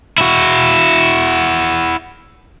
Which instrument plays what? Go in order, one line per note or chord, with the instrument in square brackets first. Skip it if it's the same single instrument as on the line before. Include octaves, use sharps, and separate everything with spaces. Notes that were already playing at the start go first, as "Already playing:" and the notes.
[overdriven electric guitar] E4 F#4